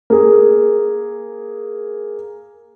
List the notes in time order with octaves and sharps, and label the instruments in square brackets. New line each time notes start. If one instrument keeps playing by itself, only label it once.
[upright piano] A#3 G#4